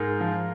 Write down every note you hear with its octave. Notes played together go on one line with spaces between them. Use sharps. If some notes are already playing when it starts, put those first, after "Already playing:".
Already playing: G#2 G#4 A#4
F3